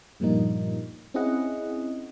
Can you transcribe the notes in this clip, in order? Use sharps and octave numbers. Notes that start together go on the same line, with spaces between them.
G2 A#2 F3 G3 A#3 D#4
C4 C#4 E4 G#4 D#5 F#5